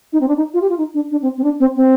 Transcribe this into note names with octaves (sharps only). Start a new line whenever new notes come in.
D#4
C4
D4
D#4
F4
G4
F4
D#4
D4
D4
C4
C4
D4
C4
C4